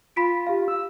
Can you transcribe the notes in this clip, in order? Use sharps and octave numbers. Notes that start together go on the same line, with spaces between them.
F4 B5 B6 D7
G4 F5
E6